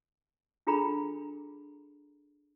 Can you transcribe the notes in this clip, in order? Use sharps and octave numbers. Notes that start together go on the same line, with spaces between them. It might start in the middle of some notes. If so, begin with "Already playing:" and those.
D4 F4 G#4 A4 A#5 B5